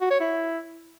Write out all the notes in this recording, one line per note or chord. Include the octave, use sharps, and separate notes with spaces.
F#4
C#5
E4